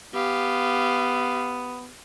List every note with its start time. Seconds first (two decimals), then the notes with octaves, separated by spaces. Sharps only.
0.14 B3 G4 F5